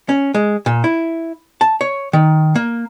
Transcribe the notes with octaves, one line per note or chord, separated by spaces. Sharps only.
C#4
G#3
A#2
E4
A5
C#5
D#3
A#3